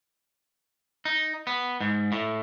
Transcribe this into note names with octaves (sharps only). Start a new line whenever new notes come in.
D#4
B3
G#2
A2